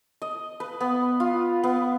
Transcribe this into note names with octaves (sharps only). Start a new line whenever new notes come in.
D#5
B4
B3
F4
B3